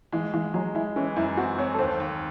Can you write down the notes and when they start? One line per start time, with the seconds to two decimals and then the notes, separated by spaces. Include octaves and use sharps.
0.12 E3 G#3
0.33 E3 G#3
0.54 F#3 G#3
0.75 G#3 E4
0.96 E3 C#4
1.16 F#2 E4
1.37 C4 F#4
1.59 C4 C#5
1.74 A4
1.79 D#2 C5
2.00 D#2